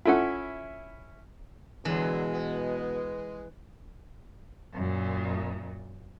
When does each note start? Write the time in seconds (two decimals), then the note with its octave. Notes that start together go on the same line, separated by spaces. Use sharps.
0.06 C#4 E4 F4 A4 F#5
1.85 B2 D3 E3 F#3 G#3
2.33 B3
4.74 F#2 A#2